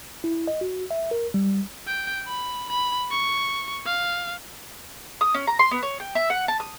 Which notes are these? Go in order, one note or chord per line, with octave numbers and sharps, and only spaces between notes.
E4
D#5
F#4
E5
A#4
G3
G5
B5
B5
C#6
F5
D#6
C#4
A#5
C6
B3
C#5
G5
E5
F#5
A5
D#6